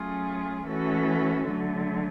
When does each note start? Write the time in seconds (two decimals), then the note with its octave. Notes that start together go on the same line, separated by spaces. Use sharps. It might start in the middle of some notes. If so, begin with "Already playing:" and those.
Already playing: F#3 A3 C#4 F4 G#4
0.65 E3 A3 C#4 F#4 A4
1.47 D3 F#3 A3